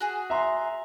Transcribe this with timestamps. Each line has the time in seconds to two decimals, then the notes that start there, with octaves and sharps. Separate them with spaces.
0.01 F#4 G#4
0.30 E5 A#5 C6